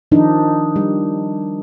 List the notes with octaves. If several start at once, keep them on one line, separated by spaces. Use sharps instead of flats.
D#3 F3 D4 D#4
G3